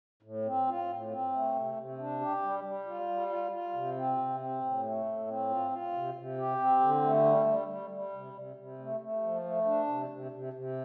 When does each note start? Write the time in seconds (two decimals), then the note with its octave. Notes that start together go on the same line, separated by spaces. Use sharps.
0.23 A2
0.45 C4
0.67 F4
0.89 A2
1.10 C4
1.32 A3
1.55 C3
1.76 C3
1.98 D4
2.21 G4
2.42 G3
2.64 G3
2.86 F4
3.08 G3
3.29 F4
3.52 F4
3.73 C3
3.96 C4
4.18 C3
4.40 C4
4.61 A2
4.83 A3
5.05 A2
5.27 C4
5.49 F4
5.71 F4
5.93 C3
6.15 C3
6.37 G4
6.59 C4
6.80 D3
7.02 A3
7.24 G3
7.46 G3
7.68 G3
7.90 G3
8.13 C3
8.34 C3
8.56 C3
8.78 A3
9.00 A3
9.22 F3
9.44 A3
9.65 D4
9.87 C3
10.10 C3
10.32 C3
10.53 C3